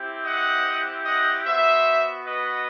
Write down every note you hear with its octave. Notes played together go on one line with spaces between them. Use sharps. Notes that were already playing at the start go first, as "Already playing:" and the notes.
Already playing: C4 E4 G4
D#5 F#5
D#5 F#5
B3 F#4 C5 E5
B4 D#5